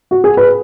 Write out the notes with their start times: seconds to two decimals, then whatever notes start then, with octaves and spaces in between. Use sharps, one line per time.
0.11 F#4
0.24 G#4
0.37 B4